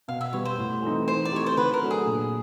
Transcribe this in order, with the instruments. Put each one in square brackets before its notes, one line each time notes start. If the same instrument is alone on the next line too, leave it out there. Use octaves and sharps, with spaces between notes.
[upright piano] B2 [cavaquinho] F5
[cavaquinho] E5
[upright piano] G3 B3 [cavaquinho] C#5
[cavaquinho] C5
[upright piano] A2
E3 A3 C4 D#4
[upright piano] E3 [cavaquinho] C5
[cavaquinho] D5
[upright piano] A3 C4 D#4 G4 [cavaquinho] C#5
[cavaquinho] C5
[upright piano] D3 [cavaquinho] B4
[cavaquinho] A#4
[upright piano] F#3 A3 D4
[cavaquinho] G#4
[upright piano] A#2